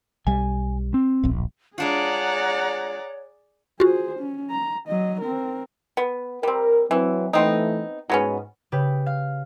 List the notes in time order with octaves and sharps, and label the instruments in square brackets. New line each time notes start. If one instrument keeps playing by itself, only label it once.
[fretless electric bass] B1 G3 [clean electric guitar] G#5
[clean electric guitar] C4
[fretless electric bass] D1 A#1
[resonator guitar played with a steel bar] G#3 D4 F4 [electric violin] G#4 D5 [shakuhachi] C#5 [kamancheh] F#5 A#5
[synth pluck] F4 F#4 [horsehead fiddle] G#4 C5
[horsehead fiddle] C#4
A#5
F#3 D#5
C4 A#4
[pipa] B3
[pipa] G3 C4 [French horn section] A#4
[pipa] E3 [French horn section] F#3 C4
[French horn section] E3 A3 [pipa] B3 C4 D#4
[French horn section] G#2 [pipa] F#3 B3 C#4
[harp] C#3 G4 B4
F5